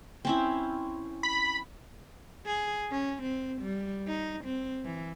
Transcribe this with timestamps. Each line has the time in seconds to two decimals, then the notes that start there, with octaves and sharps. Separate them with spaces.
0.25 C4 C#4 E4
1.23 B5
2.46 G#4
2.91 C#4
3.23 C4
3.62 G3
4.08 D#4
4.44 C4
4.85 E3